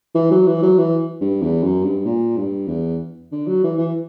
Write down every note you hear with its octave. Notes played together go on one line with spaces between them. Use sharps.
E3
F#3
E3
F#3
E3
G2
E2
F#2
G2
A#2
G2
E2
D3
F#3
E3
E3